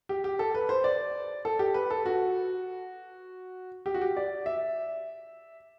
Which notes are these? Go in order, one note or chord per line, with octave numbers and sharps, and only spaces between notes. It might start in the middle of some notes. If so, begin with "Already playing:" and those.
G4
G4
A4
B4
C5
D5
A4
G4
B4
A4
F#4
G4
F#4
G4
D5
E5